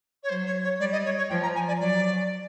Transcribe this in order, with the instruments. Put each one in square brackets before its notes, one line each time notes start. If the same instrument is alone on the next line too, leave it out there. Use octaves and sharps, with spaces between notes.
[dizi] C#5
[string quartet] F#3 [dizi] C5
[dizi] C#5
C#5
[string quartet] G3 [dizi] D5
[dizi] D#5
C#5
C#5
[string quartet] F3 [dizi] G5
[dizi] A#5
G#5
D5
[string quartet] F#3 [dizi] D5